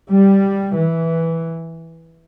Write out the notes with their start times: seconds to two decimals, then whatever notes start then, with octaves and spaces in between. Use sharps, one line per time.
0.10 G3
0.77 E3